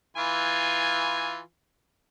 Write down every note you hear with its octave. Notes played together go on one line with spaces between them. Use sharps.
E3 F4 G#5